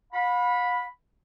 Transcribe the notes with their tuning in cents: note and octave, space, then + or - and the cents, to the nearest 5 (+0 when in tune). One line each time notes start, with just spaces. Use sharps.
F5 +45 B5 -5